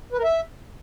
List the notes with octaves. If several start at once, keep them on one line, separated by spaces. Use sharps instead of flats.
B4
A#4
E5